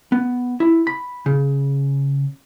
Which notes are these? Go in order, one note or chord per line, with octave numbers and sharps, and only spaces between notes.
B3
E4
B5
C#3